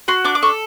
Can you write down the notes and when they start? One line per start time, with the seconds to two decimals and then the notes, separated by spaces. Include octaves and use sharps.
0.08 F#4 C6
0.25 D4 D6
0.35 D6
0.43 A4 C#6